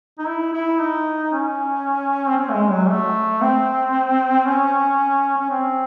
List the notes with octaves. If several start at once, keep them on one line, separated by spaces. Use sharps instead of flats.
D#4
E4
E4
D#4
C#4
C4
C#4
A3
G#3
F#3
A3
C4
C#4
C#4
C4